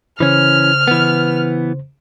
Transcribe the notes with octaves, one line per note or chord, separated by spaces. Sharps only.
C#3 E3 C#4 C5 F6
E3 B3